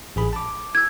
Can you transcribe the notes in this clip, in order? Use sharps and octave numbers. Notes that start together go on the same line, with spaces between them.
A1 G#4 B5
A5 D6
E6 G#6